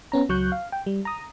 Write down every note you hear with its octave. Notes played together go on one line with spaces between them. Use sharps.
B3 C#4 A#5
C#2 F#3 C#6 F#6 G6
F5
G5
G3
A#5 D#6